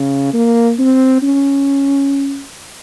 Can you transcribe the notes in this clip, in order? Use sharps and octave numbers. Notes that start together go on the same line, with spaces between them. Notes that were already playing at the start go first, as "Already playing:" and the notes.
Already playing: C#3
A#3
C4
C#4